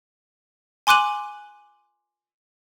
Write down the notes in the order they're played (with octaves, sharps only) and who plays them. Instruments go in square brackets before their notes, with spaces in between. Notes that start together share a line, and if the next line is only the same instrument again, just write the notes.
[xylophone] G#5 C6 D6 F#6 D#7 F#7